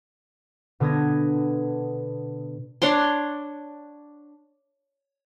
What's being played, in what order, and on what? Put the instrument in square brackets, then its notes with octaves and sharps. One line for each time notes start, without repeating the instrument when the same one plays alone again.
[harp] B2 D3 B3 D#6 G#6 A#6
[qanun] D4 C#5 F#5 C6